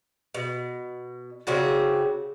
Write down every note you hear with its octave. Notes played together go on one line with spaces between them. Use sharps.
B2
C#3 C4 F#4 G4